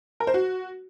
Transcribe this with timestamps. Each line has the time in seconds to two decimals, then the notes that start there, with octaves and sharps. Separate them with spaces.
0.20 A#4
0.27 C5
0.34 F#4